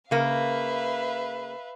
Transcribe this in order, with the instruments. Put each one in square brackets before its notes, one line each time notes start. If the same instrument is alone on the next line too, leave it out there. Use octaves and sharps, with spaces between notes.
[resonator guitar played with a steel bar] C#3 A#3 [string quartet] B4 E5 F5